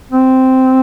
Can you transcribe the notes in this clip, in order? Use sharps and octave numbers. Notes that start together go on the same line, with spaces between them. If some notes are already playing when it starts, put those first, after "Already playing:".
C4